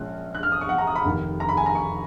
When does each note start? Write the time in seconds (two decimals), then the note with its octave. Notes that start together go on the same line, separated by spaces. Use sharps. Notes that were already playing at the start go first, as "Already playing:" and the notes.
Already playing: A#1 A#2 G#3 C#4 F4 F#6
0.35 F#6
0.43 F6
0.52 D#6
0.61 C#6
0.69 F#5
0.78 A#5
0.87 D#6
0.96 B5
1.05 F1 D#2 D#3
1.40 A#5
1.49 B5
1.57 G#5
1.66 A#5
1.75 C#6